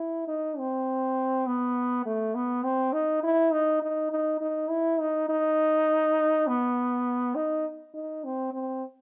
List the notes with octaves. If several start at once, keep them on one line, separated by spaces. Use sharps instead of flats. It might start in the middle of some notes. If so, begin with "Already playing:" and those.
Already playing: E4
D#4
C4
B3
A3
B3
C4
D#4
E4
D#4
D#4
D#4
D#4
E4
D#4
D#4
B3
D#4
D#4
C4
C4